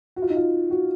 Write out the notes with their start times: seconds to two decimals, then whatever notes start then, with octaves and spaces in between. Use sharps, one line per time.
0.16 F#4
0.22 F4
0.30 D#4
0.36 F4
0.71 F#4